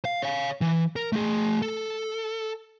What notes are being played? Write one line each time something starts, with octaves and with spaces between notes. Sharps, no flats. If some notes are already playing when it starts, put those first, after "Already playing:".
F5
C#5 F5
E3
A#4
A3 G#4
A4